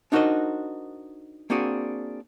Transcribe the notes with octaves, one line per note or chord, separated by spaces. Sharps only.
D4 D#4 F#4 A#4 C5 D#5
A#3 C4 D4 F#4 G#4